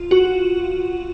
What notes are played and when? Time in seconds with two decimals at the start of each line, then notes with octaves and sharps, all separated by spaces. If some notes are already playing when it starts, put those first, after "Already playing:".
Already playing: F4
0.11 F#4